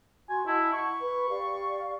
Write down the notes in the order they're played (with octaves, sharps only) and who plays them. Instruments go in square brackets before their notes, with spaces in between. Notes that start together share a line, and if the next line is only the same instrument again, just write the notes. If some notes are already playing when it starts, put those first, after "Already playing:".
[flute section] F#4 C6 C#6 [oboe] G#5
[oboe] E4 [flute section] D#5 F#5 A5
[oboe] C#6
[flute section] B4 B5
G4 D5 F5